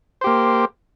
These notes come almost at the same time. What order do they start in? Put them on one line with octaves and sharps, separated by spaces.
C5 G4 A#3